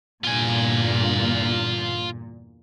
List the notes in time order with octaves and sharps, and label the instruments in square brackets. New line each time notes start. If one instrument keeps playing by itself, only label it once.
[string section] E2 G2 D3 [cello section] A#2 [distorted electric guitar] F4 G#5